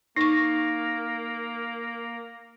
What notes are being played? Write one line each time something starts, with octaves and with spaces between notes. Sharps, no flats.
A#3 D#4 C#6 A#6